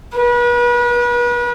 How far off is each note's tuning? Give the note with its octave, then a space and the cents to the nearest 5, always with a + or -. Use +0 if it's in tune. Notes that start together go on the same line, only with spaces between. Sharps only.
B4 -35